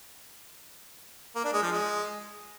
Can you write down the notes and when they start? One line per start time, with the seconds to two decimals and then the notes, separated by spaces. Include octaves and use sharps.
1.35 A#3
1.44 D4
1.53 G#3
1.62 F3
1.71 G#3